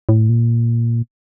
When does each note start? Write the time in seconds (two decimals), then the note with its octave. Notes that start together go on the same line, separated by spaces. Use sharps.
0.09 A2
0.29 A#2